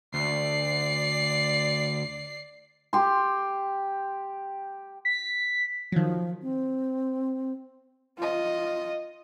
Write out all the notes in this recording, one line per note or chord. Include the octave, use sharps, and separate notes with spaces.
D2 D5 C7
G4 C6
B6
D#3 F3 F#3
C4
F4 D#5